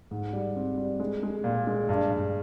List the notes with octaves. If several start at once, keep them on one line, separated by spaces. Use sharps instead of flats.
G#2
G3
C4
G3
G#3
G#3
A#2
G#3
G2
G2